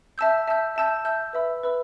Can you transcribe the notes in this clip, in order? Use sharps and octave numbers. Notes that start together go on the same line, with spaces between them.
E5 A5 E6 G6
E5 A5 E6 G6
E5 A5 E6 G6
E5 A5 E6 G6
B4 E5 B5 E6
B4 E5 B5 E6